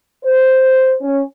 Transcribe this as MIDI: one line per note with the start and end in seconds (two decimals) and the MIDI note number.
0.24 0.94 72
1.02 1.22 61